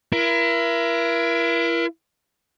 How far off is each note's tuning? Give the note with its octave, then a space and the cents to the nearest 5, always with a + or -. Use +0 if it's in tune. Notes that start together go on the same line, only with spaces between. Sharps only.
E4 +35 A#4 +35